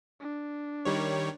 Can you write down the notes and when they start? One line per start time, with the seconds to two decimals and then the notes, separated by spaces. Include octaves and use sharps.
0.21 D4
0.85 D#3 G3 C#5